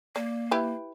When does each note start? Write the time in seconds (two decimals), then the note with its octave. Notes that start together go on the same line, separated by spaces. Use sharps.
0.16 A#3 D5
0.51 E4 G4 B4